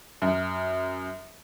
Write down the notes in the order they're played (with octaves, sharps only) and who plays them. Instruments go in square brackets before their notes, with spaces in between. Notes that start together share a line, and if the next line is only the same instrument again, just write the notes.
[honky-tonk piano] F#2